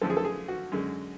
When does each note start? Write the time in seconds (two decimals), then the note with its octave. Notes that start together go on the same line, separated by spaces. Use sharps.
0.01 F#2 D3 F3 A3 A4
0.10 G#4
0.17 A4
0.25 G#4
0.48 F#4
0.72 F#2 D3 G#3